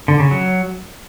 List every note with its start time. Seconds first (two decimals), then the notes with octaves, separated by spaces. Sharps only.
0.08 D3
0.20 C#3
0.31 F#3